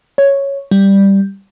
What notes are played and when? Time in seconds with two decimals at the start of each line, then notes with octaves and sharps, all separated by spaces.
0.18 C#5
0.71 G3